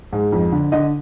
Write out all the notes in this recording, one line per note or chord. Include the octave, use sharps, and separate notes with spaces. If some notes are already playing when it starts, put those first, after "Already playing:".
G#2
F2
D3
D3 D#5